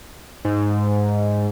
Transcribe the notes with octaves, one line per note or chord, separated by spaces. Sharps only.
G#2